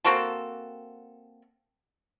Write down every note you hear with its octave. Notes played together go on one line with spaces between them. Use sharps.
A#3 C4 F#4 A4